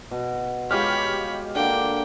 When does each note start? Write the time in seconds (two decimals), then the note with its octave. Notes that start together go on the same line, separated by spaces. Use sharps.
0.11 B2
0.71 G#3 F4 G4 C#5 B5 F6
1.55 D3 A#3 G5